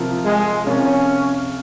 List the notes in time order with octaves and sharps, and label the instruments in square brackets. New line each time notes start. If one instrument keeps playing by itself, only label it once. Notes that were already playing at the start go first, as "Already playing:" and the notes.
Already playing: [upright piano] C3 F3 C4 F4 A#4
[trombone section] G#3
[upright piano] C3 F3 C4 F4 A#4 [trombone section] C#4